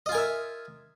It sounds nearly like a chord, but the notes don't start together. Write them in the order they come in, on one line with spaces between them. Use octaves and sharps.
D#5 F4 G#5 A#4 E5